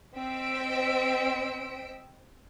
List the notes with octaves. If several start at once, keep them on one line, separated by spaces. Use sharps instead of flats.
C4 C5 D#5 E6 B6 D7